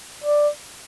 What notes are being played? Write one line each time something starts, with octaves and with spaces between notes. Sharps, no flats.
D5